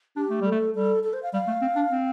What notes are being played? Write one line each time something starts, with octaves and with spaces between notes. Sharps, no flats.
D4 G4
A3
G3 A4
A3
G3 A4
A4
C5
F5
G3 F5
A3
C4
D4
C4